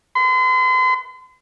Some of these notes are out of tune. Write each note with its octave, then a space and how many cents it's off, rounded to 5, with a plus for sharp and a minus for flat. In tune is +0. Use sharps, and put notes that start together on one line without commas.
C6 -40